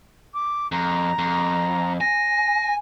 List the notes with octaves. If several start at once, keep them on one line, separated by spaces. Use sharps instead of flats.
D6
F2 A#5
F2
G#5 A#6